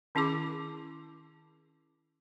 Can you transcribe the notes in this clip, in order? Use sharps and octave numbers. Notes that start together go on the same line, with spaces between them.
D#3 C#4 E4 G#4 D6